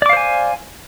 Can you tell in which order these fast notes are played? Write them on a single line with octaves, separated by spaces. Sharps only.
D5 D6 F5 C5 G#5